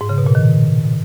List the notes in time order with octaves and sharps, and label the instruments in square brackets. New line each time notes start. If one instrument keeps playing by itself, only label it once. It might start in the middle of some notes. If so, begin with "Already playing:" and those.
[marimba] G#2
C#3
B2
A#2
D#3